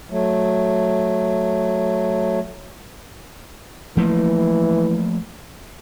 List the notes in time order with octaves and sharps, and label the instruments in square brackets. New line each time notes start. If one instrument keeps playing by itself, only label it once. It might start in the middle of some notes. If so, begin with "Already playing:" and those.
[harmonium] F#3 A3
[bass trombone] E3 [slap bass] F3 A3 A#3